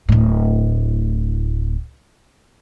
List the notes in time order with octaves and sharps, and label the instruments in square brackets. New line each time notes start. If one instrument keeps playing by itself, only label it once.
[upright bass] D1 A2